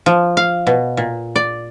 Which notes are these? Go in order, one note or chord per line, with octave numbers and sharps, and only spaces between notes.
F3
F5
B2
A#2
D5